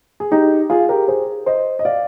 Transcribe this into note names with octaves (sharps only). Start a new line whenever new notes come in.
G#4
D#4 G4
F4 G#4
G4 A#4
G#4 C5
C5 D#5
D#5
D5 F5